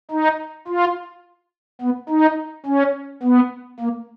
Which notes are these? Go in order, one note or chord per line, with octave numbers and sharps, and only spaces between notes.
D#4
F4
B3
D#4
C#4
B3
A#3